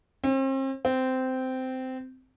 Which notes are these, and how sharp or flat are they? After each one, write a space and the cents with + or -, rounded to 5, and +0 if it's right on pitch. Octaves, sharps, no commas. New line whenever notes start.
C4 +40
C4 -15